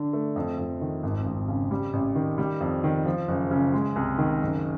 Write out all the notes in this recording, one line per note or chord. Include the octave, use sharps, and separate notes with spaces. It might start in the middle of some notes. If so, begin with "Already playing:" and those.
Already playing: D3 D4
A3
F2
F2
D#3
G#1
G#1
C#3
G3
A1
D#3
G3
F2
D#3
F3
F#1
C#3
G#3
C2
D#3
F#1